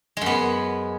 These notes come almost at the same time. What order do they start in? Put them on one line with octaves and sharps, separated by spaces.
G#3 F#2 B3